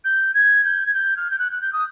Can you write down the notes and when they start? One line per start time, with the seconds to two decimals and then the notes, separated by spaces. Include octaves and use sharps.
0.04 G6
0.34 G#6
0.64 G6
0.86 G#6
0.94 G6
1.17 F6
1.30 G6
1.39 F#6
1.52 F#6
1.61 G6
1.73 D#6